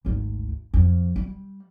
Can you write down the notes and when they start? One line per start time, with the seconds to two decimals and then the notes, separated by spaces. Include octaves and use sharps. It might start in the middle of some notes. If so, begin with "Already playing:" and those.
0.05 G#1 D2
0.74 F2
1.16 G3